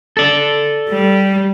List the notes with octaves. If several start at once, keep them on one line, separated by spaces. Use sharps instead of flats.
A4 D5
G3